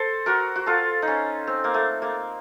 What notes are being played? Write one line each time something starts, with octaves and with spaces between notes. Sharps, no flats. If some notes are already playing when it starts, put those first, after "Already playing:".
Already playing: A4 C5
F#4 A#4
F#4
F4 A4
D#4
C#4
C4
A#3
A3
A#3